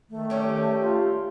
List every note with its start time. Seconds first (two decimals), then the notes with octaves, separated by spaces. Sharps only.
0.10 D#3 A3
0.30 G3 C#4 G4
0.80 F4